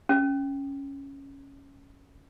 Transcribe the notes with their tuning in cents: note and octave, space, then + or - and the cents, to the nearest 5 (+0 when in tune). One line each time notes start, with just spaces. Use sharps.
C#4 +0